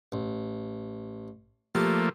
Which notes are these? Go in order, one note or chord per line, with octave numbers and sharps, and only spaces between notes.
A1
F3 A3 A#3 G4